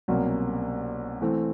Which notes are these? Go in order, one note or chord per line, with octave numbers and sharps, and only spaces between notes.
C2 B2 F#3 A#3 C#4
E3 A3 C4